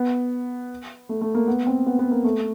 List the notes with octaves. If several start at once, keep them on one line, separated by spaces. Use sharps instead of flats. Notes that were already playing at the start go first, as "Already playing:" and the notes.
Already playing: B3
A3
A3
A#3
B3
C4
B3
B3
A#3
A3